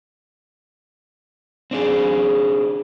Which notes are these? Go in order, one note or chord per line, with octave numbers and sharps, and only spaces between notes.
C4 D4 G#4